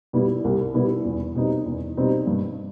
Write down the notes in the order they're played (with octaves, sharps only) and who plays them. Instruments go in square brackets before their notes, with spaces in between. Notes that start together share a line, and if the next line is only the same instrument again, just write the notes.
[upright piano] B2 G3 B3 E4
C2
B2 G3 B3 E4
E2
B2 G3 C4 D#4
E2
B2 G3 C4 D#4
G2